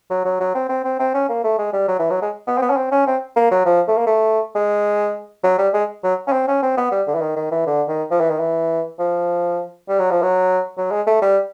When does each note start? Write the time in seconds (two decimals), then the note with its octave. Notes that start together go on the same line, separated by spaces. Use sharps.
0.10 F#3
0.25 F#3
0.40 F#3
0.55 C4
0.69 C4
0.84 C4
0.99 C4
1.14 C#4
1.29 A#3
1.44 A3
1.58 G#3
1.73 G3
1.88 F#3
1.99 E3
2.10 F#3
2.22 G#3
2.47 B3
2.58 C4
2.62 B3
2.70 C#4
2.77 C4
2.92 C#4
3.07 C4
3.36 A#3
3.51 F#3
3.65 F3
3.88 A3
3.97 A#3
4.06 A3
4.55 G#3
5.43 F#3
5.58 G3
5.73 G#3
6.04 F#3
6.27 C#4
6.32 C4
6.48 C#4
6.62 C4
6.77 B3
6.91 G3
7.07 D3
7.15 E3
7.21 D#3
7.36 D#3
7.51 E3
7.67 D3
7.88 D#3
8.11 F3
8.20 E3
8.30 D#3
8.39 E3
8.99 F3
9.88 G3
9.99 F#3
10.11 F3
10.22 F#3
10.77 F#3
10.91 G#3
11.07 A3
11.22 G3